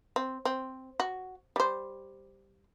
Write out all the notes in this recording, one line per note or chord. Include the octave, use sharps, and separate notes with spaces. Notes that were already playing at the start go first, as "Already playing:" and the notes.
C4
C4
F#4
G3 C5